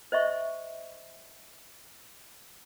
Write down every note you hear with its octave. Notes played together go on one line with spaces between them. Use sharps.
C5 D#5 E5 C#6